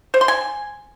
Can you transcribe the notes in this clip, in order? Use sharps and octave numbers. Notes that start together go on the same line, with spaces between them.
C5
C6
G#5